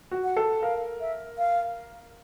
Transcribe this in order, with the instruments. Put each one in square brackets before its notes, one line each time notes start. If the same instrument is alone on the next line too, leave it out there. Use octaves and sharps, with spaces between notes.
[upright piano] F#4
[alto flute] F#5
[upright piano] A4
[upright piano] A#4 [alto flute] F5
[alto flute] E5
F5